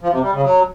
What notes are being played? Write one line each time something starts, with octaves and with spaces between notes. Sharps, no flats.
F3
C3
G3
C#3
F#3